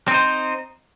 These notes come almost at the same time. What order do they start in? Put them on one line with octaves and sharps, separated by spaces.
C4 D#4 C5